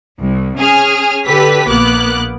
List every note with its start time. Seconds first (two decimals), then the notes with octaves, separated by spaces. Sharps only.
0.20 C2
0.58 C#4 G#4 G#5 F6
1.26 D3 G4 A4 B4 B6
1.68 A#1 A#3 B3 D6 F#6